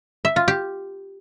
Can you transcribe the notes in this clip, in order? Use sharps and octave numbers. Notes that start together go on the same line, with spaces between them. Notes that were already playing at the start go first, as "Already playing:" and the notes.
E5
F4
G4